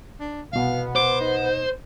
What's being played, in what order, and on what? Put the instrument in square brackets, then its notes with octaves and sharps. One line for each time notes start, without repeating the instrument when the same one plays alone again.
[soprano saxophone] D4
[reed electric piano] C2 B2 [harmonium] B3 [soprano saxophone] F5
[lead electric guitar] C5 [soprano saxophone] D6
[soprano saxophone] D#4